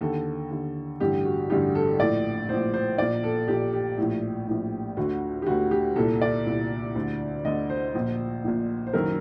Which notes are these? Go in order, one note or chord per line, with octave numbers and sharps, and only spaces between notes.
D#2 D3 A4
D#2 D3
A1 G2 D3 G4
F#4
A1 G2 D3 G4
A4
A#1 A2 D5
A#1 A2 C5
C5
A#1 A#2 D5
A4
A#1 A#2 G4
G4
A#1 A2
A#1 A2
D2 D3 F#4
G4
D2 D3 F#4
G4
C2 A#2 A4
D5
C2 A#2
D2 D3
D2 D3 D#5
C5
A#1 A#2
A#1 A#2
C5
F#1 F#2 D#3 A#4